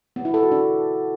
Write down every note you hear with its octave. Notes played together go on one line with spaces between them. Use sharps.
B3
E4
A4
F#4
D4